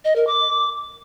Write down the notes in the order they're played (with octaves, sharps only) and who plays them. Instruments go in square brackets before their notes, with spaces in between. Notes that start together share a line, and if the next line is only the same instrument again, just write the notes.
[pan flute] D#5
A#4
D6